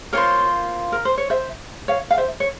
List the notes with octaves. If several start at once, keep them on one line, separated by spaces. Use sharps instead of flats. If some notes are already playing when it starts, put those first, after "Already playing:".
A#3 F4 A#4 C5 C#5
A#4
C5
C#5
C5 E5
C#5 F5
F5
C5 E5
C#5